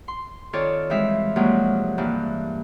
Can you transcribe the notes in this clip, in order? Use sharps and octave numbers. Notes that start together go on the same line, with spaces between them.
C6
D#3 C4 F4 A4 C#5 D5
E3 G3 G#3 C4 E5 F5
G2 C3 F3 F#3 G#3 A#3
G2 E3 A#3